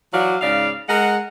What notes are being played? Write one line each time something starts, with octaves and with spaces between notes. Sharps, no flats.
E3 F#3 F#4 D5 F5
G#2 C#3 D5 F5
G#3 A#4 F#5